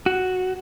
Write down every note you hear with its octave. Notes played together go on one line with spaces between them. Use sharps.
F#4